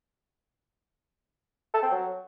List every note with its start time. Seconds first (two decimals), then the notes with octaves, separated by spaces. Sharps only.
1.74 A4
1.83 C4
1.91 F#3